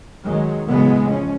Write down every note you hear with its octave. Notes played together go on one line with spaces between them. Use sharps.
D#3 F#3 G#3
A2 C#3 E3 F#3 G#3 B3
F3 C#4